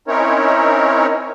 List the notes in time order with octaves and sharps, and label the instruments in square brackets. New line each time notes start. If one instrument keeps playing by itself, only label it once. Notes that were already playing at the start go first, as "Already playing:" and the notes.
[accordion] C4 C#4 D#4 E4 A#4 C#5